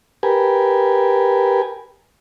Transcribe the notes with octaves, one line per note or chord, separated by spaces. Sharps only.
G4 A#4 B4 G#5